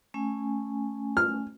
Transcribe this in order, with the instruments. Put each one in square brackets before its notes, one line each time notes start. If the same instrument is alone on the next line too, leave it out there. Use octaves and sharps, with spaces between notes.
[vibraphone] A3 C#4 G#5
[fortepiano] F6